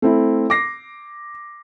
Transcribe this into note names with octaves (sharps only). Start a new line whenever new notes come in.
A3 C4 E4
D6 A#6 C7